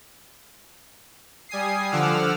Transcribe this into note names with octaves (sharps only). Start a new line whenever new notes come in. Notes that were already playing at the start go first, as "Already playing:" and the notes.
G3 G#5 D#6 C7
D3 F3 F#5 D6 E6 F6